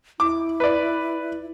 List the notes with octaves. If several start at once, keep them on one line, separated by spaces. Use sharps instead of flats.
E4 D6
B4 D5